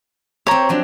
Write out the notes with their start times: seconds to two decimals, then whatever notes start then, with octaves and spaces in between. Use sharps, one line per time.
0.47 C4 G4 C#5 A#5
0.69 F3 F#3 D4